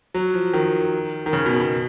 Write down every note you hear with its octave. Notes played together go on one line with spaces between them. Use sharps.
F#3
F3
D#3
D#3
C#3
B2
B2